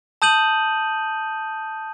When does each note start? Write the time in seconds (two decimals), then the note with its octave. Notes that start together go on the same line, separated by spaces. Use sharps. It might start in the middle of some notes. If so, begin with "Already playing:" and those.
0.22 A5 D#6 G6 D#7 F#7